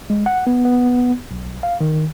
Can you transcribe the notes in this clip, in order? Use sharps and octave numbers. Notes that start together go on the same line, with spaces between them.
G#3
F#5
B3
B3
B1
F5
D#3